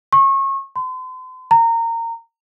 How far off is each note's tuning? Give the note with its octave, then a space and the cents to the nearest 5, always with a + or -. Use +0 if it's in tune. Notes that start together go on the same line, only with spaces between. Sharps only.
C#6 -30
C6 -40
A#5 -20